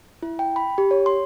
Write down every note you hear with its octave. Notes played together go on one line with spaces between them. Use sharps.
E4
G5
B5
G4
C#5
C6